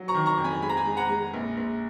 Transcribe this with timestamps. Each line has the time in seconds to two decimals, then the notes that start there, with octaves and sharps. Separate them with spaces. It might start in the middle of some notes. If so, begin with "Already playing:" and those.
Already playing: F#3
0.08 A#5 C#6
0.14 D#3
0.26 A#5 C#6
0.38 F2
0.44 G#5 B5
0.61 G#3 B5
0.70 A#5
0.77 G#5 B5
0.86 G#3
0.97 F#5 A#5
1.09 G#3
1.34 A#1
1.57 A#1